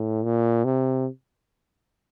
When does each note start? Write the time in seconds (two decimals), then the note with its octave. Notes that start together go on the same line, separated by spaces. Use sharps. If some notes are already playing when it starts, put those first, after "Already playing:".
Already playing: A2
0.24 A#2
0.65 C3